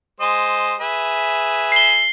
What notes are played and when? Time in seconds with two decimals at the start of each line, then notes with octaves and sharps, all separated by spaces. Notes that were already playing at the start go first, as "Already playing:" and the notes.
0.21 G#3 C5 D#5
0.80 G#4 B4 E5
1.72 C7 G7